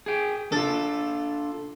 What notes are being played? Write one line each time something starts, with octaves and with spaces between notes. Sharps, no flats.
G#4 G5
D4 F4 A4